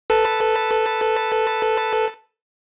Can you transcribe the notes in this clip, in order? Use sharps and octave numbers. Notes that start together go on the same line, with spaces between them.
A4 B4 A5